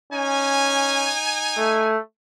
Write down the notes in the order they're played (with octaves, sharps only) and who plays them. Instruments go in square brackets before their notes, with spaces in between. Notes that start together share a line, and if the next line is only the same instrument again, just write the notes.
[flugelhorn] C#4 [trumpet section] D#4 G#5
[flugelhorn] A3